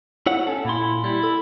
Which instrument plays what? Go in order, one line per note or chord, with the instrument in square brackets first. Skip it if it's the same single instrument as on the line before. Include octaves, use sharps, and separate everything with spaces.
[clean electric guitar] E4 C#5 F#5
[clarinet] C#4 [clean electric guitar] A4
[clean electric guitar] A#2 C6 [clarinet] E4
[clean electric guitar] G3 [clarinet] E4
[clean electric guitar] A4